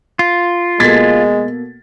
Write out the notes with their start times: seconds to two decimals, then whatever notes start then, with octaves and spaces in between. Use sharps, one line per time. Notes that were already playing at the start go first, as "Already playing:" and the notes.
0.19 F4
0.80 B2 G#3 A#3 A4 G#6 A6 B6